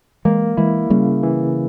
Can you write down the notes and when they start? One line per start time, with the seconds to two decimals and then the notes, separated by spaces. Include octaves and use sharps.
0.25 E3 G#3 A#3
0.57 E3 G#3 E4
0.90 C#3 G3 A#3
1.23 E3